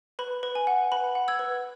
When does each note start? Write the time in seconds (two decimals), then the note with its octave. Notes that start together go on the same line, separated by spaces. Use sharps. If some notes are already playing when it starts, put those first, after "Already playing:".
0.19 B4 B5
0.43 B4
0.55 G#5
0.67 F#5
0.92 B4 B5
1.15 F#5
1.28 E6 G#6
1.39 B4